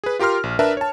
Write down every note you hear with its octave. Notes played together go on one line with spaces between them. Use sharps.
G#4 B4
F4 G4 A#4 C6 F6
A#1
D4 A#4 B4 E5 A5
C#5 A5